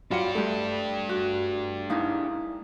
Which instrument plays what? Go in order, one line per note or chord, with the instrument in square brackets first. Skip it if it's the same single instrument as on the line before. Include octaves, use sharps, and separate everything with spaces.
[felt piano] F#3 F5 C#7 [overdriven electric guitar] D4 G4 [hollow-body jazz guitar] F4 [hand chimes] B5
[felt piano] G3 A3 [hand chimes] A4 [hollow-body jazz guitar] E5 G5
[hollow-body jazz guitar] F#4
[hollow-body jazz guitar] G#3 A#3 D#4 [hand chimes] E4 F5 D#6